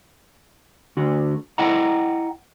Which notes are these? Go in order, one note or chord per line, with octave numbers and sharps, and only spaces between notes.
D2 D3 F#4
E4 D#5 F#5 G5 A#5